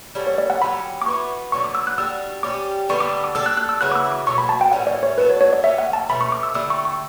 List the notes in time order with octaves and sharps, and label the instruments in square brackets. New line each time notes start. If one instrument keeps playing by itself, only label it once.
[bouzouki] G3 C#4 F#4 A4
[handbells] C#5
D5
F#5
[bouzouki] D3 F#3 C#4 G4 [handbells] B5
[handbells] D6
[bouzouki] E3 B3 F#4 [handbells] C#6
[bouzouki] D3 F#3 B3 [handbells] C#6
[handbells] D6
E6
F#6
[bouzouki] G3 D4 F#4 [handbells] E6
[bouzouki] G3 C#4 E4 G4 [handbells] D6
[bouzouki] D3 G3 B3 D4 [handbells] C#6
[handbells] D6
D6
[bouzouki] G3 D4 A4 [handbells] E6
[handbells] F#6
F#6
E6
[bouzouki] C#3 E3 B3 F#4 [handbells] F#6
[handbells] D6
E6
D6
[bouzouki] B2 F#3 A3 [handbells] C#6
[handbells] B5
A5
G5
[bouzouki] A2 E3 G3 C#4 [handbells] F#5
[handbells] D5
C#5
[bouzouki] F#3 B3 F#4 A4 [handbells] B4
[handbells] C#5
C#5
D5
[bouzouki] D3 F#3 C#4 G4 [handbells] E5
[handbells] F#5
A5
[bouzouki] B2 A3 C#4 [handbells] B5
[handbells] C#6
D6
E6
[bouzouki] D3 A3 E4 G4 [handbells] E6
[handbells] C#6
C#6